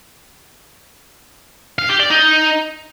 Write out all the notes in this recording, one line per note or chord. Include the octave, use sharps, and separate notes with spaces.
F5
G4
D5
D#4